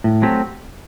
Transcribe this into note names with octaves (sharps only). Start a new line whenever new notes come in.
A2
F#3 A3 C4 G4